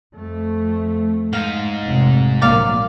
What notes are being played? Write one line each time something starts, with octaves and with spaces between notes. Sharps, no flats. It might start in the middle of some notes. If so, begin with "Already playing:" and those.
F2 A3
G#2 D#4 F5
F1 C3
A#1 F#3 A#3 D5 F5